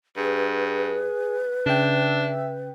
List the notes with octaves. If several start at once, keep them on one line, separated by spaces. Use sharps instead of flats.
G2 G#4 B4
C#3 D4 E5 G5